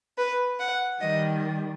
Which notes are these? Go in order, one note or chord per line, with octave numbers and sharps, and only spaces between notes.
B4
F#5
D#3 G3 D#5